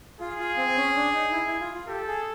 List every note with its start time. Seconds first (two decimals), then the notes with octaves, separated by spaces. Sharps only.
0.20 F4 G#4
0.39 F4
0.57 C4
0.68 C4
0.77 C#4
0.96 D4
1.13 D#4
1.32 E4
1.47 E4
1.61 F4
1.74 F4
1.88 G4 A4
2.07 G#4